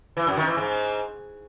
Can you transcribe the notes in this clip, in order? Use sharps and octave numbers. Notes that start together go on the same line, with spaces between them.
E3
F#2
D#3
E3
G#2